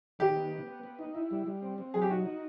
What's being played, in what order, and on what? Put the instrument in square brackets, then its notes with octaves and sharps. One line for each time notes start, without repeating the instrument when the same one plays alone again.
[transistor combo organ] D#3 [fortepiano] G4
[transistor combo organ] B3
B3
B3
B3
D#4
E4
G3
G3
C4
C4
[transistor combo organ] F#3 [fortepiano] G#4
[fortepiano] G4
[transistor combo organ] D#4 [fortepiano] F#4
[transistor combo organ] D#4